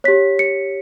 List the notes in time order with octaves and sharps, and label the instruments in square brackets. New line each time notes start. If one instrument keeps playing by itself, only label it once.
[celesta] G4 C#5 B6
C#7